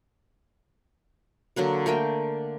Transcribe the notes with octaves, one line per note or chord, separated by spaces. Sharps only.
D3 F#3 A#3 F#4
A3 A#3 A#4 G5